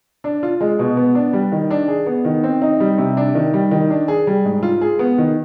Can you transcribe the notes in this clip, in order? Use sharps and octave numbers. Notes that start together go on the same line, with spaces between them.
D4
F4
G#3
B2
B3
D4
G3
D#3
D4
G#4
B3
D#3
C4
D#4
G3
C3
D4
D#3
G3
D#3
D4
G#4
G3
G#2
F4
G#4
B3
D#3